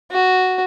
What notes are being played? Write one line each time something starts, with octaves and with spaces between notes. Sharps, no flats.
F#4